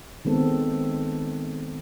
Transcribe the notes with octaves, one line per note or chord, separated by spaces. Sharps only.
D#3 G#3 B3 C4 A4